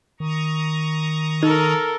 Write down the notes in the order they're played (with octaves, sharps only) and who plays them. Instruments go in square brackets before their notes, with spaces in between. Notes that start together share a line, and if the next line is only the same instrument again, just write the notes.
[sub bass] D#3 [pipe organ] A#5 C#6 D#6
[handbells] D#4 [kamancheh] A4 A#4